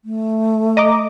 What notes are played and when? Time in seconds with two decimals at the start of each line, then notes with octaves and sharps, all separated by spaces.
0.05 A3
0.77 D#5 A#5 D6